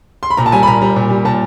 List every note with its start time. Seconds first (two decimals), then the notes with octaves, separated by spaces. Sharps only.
0.23 C6
0.30 B5
0.37 A#2 A#5
0.46 A5
0.52 G3 G#5
0.63 B5
0.67 A#2 A#5
0.82 G3
0.96 A#2
1.10 G3
1.25 A#2 A5